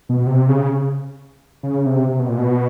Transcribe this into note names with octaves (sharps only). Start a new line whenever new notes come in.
B2
C3
C#3
C#3
C3
C3
B2
A#2
B2